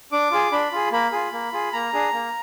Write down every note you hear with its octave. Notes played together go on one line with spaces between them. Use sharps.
D4 D6
F4 G#4
D4 B5
F4 G#4
A#3 B5
F4 G#4
A#3
F4 G#4
A#3 A#5
D4 G#4
A#3